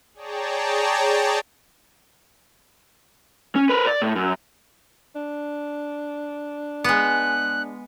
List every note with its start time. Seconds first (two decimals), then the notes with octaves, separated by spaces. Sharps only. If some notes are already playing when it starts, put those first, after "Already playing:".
0.14 G#4 C#5 D5 G5 A5 A#5
3.56 C#4
3.69 A#4 B4
3.87 D5
4.02 A2
4.16 F#2
5.16 D4
6.84 G#3 B3 F#6